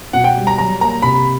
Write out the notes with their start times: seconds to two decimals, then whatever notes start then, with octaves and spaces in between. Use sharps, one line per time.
0.13 B2 F#5
0.24 G5
0.36 G3
0.47 A#5
0.58 F#3 A#5
0.80 A#3 A#5
1.02 C3 B5